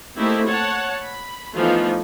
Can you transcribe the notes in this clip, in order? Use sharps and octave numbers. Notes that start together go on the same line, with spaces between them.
A3 A#3 C4 D#4 E4 G4
C#5 F#5 A5
B5
E3 F3 A3 B3 D#4 F4